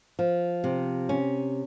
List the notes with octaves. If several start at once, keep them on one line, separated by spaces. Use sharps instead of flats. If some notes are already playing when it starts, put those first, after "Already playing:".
F3
C3
C#4